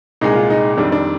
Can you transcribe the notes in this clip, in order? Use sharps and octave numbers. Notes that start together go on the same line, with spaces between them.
C2 A#2 G#3 D#4
F4
D#4
F2 D#3 G3 D4
D4